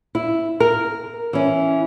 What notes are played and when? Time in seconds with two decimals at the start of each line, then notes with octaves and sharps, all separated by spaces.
0.15 E4
0.60 A#4
1.33 E3 C#4